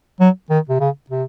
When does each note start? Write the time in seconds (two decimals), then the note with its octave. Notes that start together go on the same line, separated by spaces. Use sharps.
0.20 F#3
0.50 D#3
0.69 C3
0.80 C#3
1.10 C3